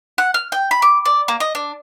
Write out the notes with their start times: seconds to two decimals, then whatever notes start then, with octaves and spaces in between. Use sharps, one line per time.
0.18 F#5
0.34 F6
0.52 G5
0.71 B5
0.82 D6
1.05 D5
1.28 A#3
1.40 D#5
1.55 D4